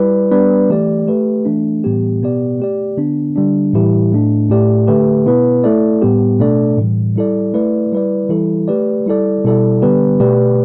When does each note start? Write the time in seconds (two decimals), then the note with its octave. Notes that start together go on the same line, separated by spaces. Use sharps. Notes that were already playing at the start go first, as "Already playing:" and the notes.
Already playing: G3 E4 B4 D5
0.31 G3 B3 D4 B4 D5
0.69 E3 A3 G4 D5
1.07 A3 G4 B4
1.45 E3 A3 D4
1.84 A2 E3 G3 B3 G4
2.22 B2 B3 G4 D5
2.60 A3 G4 D5
2.97 D3 B3 D4
3.36 D3 G3 D4
3.73 A2 E3 G3 E4 G4
4.12 A2 A3 D4
4.50 A2 A3 G4 D5
4.87 D3 A3 G4 B4
5.26 B2 B3 E4 B4
5.64 A3 E4 A4 D5
6.02 A2 G3 B3 G4
6.39 B2 A3 D4 A4 D5
6.78 A2 E3 G3
7.16 G3 E4 A4 D5
7.54 A3 E4 B4 D5
7.92 G3 E4 B4 D5
8.29 E3 G3 E4 A4
8.68 A3 G4 B4 D5
9.06 G3 E4 A4 D5
9.44 B2 G3 E4 A4 D5
9.82 D3 G3 B3 G4 B4
10.20 B2 A3 G4 B4 D5